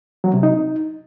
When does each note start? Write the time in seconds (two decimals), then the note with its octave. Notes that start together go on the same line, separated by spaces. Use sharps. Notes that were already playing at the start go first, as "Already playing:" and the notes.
0.24 F#3
0.34 C3
0.43 D#4